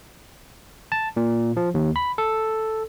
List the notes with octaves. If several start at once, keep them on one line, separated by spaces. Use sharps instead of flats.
A5
A#2
F3
D#2
B5
A4